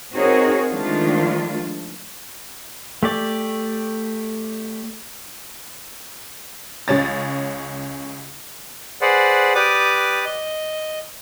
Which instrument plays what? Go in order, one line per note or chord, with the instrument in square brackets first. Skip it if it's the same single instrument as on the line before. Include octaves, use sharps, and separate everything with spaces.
[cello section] C4 D#4 F#4 G#4 A#4 C#5
D#3 F3 G#3 A3 D4 F4
[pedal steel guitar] A3 G4 D5
[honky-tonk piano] C#2 C#4 A6
[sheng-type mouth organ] G#4 B4 C5 D5 F#5
G4 B4 D5 D6 D#6
D#5